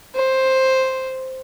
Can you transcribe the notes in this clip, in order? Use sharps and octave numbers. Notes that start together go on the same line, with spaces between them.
C5